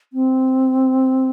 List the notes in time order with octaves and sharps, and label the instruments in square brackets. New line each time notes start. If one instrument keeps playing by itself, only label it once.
[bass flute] C4